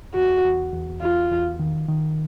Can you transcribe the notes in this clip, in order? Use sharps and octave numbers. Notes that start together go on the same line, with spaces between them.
E2 F#4
E2
E2
E2 F4
E2
D#3
D#3